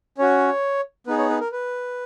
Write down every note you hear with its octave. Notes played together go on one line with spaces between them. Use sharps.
C#4 F#4 C#5
B3 D#4 G#4 B4
C#5
B4
A#4
B4